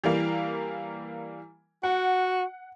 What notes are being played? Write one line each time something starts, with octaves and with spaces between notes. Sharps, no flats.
E3 G3 A#3
F#4 F#5